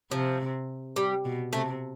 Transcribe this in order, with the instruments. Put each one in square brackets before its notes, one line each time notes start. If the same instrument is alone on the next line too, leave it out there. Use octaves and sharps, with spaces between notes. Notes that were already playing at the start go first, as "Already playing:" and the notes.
[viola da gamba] C3 [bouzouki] F3
[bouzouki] G3
[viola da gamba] B2
[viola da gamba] C3 [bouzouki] A3